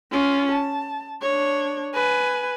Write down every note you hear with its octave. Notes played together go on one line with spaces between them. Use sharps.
C#4 F4
A5
D4 C#5
B4 G#5